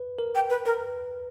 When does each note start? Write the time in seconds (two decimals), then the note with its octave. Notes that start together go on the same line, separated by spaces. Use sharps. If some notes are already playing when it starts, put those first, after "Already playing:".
Already playing: B4
0.19 A#4
0.35 G5
0.50 B4
0.66 A#4 B4